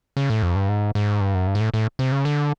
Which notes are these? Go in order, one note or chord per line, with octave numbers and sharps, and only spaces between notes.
C#3
A2
F2
G2
G#2
G#2
G2
F#2
G2
G#2
A2
A2
C3
C#3
D3